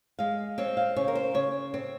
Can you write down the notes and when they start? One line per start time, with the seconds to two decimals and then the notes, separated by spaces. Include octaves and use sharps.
0.19 G#3 F5
0.58 C4 C#5
0.77 F5
0.96 C#3 C#5
1.08 A#4
1.15 C5
1.34 C#3 C#5
1.74 C4 C#5